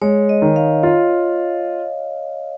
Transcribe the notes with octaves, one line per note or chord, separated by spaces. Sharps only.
G#3 C#5
D#5
D#3
F5
F4